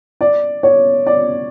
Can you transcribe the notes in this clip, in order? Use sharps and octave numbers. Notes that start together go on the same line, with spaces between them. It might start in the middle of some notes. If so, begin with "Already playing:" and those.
D5
C#5
D5